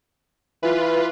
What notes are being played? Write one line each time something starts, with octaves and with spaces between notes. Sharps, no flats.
E3 F4 B4